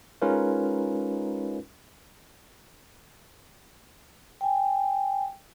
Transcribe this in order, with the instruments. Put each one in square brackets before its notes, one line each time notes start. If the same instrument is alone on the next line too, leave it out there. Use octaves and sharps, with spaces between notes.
[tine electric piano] G#3 C#4 D#4 F4 A#4 B4
[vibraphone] G5 G#5